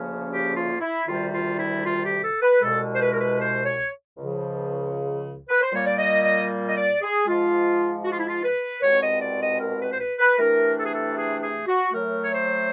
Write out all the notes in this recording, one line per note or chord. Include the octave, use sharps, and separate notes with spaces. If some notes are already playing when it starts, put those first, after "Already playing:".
Already playing: D2 C#3 F3 A#3 C#4
G4
F4
E4
D2 C3 D#3 G3 F4
F4
E4
F4
G4
A4
B4
C2 B2 G#3 A4
C5
B4
A#4
B4
C5
C#5
C#2 C#3 F3
B4
C5
A#2 G3 A#3 C#5
D5
D#5
D#5
D#5
D5
G#4
G#2 F3 G#3 F4
F#4
F4
E4
F4
B4
C2 B2 G#3 C4 C#5
D#5
D5
D#5
A#4
B4
C5
B4
B4
C3 E3 A3 D4 A#4
A4
G#4
A4
G#4
G#4
F#4
A2 F#3 A3 A#4
C#5
C5